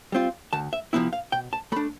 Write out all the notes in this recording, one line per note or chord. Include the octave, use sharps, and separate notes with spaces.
G3 C4 F4
D2 A5
E5
C3 F3 B3 E4 E5
F5
B2 G5
A5
A3 D4 B5